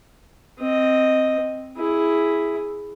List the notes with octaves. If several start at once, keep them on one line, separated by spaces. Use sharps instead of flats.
C4 D#5
E4 G#4